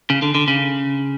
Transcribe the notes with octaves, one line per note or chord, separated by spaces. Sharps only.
C#3
D3
D3
C#3